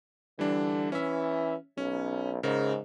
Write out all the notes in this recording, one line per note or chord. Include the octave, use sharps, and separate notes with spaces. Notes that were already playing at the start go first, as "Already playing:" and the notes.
D3 E3 G3 D4
E3 C#4 E5
B1 C#4
G#2 C#3 A#4